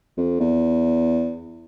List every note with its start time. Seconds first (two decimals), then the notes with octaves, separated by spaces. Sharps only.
0.17 F2
0.40 E2